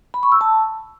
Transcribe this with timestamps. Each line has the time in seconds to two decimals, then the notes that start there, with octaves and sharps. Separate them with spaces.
0.14 B5
0.23 C#6
0.32 E6
0.41 A5